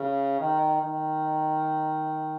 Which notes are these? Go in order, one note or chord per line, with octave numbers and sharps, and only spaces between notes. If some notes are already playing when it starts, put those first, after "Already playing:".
Already playing: C#3
D#3
D#3